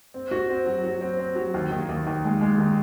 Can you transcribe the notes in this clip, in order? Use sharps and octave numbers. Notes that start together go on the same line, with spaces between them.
C4
F#4
C4
F#3
F#3
C4
C4
F#3
D#2
D#3
D#2
D#2
G#3
G#3
D#3